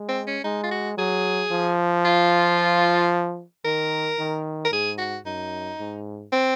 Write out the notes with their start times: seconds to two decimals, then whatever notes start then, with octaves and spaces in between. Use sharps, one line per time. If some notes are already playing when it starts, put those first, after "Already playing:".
Already playing: G#3
0.09 C4
0.27 C#4
0.44 G#3 D#4
0.64 F4
0.71 F#4
0.97 F#3 G#4
1.51 F3
2.05 F4
3.65 D#3 A#4
4.19 D#3
4.65 A#4
4.72 G#2 G#4
4.98 F#4
5.25 F#2 D#4
5.80 G#2
6.33 C4